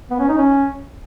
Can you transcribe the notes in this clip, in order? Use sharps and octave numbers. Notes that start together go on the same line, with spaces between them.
B3
C#4
D#4
C#4